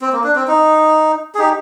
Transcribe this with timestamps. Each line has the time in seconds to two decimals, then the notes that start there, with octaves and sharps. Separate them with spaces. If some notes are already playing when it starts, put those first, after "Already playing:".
0.01 C4
0.12 A#3
0.24 D4
0.35 C4
0.47 D#4
1.35 G#4
1.38 D#4 G4